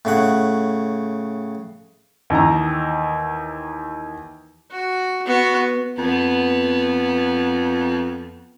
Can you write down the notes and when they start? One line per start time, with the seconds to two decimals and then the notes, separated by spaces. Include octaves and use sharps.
0.05 A2 C#3 F#5
2.30 D#2 D#3 E3 A#5
4.71 F#4
5.25 B3 F#4
5.98 F2 B3